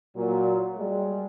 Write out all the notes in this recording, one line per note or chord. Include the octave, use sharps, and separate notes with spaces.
A#2 F#3
G3 G#3